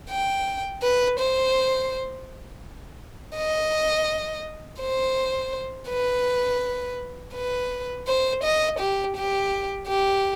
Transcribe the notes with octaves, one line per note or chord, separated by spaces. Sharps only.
G5
B4
C5
D#5
C5
B4
B4
C5
D#5
G4
G4
G4